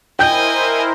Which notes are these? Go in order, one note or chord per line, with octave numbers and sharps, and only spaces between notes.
E4 A#4 C5 D#5 G5 G#5 G6